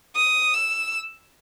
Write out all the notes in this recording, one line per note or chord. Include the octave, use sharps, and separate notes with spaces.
D#6
E6